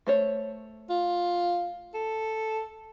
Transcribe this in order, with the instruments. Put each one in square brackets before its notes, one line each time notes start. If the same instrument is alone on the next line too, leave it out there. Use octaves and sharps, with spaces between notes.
[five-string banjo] A3 C5 C#5
[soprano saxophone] F4
A4